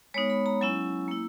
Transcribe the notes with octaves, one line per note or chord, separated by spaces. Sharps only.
G#3 B3 D#4 C#5
B5
A#5
F#3 C#4 E4 G#5
A#3 E4